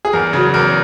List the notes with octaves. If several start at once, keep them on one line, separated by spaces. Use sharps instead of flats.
G#4
E2 A#4
C#3 F#3
E2 A#4